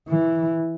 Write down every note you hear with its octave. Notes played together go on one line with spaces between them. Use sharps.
E3